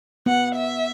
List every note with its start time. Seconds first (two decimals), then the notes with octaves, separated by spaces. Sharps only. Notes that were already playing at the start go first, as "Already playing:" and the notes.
0.26 B3 F#5
0.56 E5